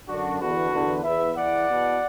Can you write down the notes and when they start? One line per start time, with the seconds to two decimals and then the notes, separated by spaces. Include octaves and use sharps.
0.08 F#2 D3 D4 F#4
0.40 E2 D3 F#4 B4
0.73 E2 D3
1.04 E2 E3 B4 E5
1.35 E2 E3 D5 F#5
1.68 E2 B2